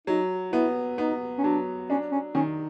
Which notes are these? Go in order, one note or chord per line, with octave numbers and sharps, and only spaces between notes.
F#3 D#4
B3 E4
B3 D#4
C#4
F#3 D4
C#4 D4
C#4
D#3 C#4